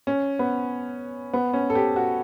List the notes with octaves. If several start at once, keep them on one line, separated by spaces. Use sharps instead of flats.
C#4
B3
B3
C#4
A4
G4
F#4